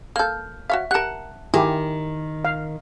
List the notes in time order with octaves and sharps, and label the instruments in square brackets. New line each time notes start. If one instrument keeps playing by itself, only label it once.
[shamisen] A#3 A4 [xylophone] F6 G6
[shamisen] F#4 C#5 F5 [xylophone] E5
[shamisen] G4 A#4 [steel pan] F#5 [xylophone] A5 F#6
[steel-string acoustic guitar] D#3 [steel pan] E4 G4 [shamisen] G#4
[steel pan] F5